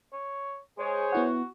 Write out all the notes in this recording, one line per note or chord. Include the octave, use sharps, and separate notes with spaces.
C#5
G#3 G#4 C5 C#5
B3 E4 F#4 F#5